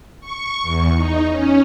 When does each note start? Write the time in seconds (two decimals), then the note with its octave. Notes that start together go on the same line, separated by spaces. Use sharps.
0.21 C#6
0.62 E2
0.96 D#4
1.30 C#4